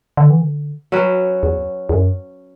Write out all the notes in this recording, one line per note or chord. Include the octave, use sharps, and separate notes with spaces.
D3
E3
D3
F#3 C#4 F#4 B4
E2
E2
F#2